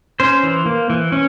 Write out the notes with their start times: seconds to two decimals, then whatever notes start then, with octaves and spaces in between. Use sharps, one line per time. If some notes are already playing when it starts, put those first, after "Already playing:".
0.20 C#4 C5
0.43 E3
0.66 A#3
0.90 E3
1.12 C#4